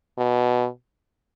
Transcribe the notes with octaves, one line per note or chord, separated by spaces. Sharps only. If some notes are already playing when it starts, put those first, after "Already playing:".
B2